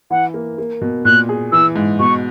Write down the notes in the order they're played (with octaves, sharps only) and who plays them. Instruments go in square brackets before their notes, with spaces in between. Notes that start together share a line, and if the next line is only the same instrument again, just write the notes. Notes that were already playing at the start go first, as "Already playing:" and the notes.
[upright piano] E3 [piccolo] F#5
[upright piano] A#3
A#3
B2
[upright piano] A#2 [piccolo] F#6
[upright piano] G#4
[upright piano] E3 [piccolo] E6
[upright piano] G#2
[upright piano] B2 [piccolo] C#6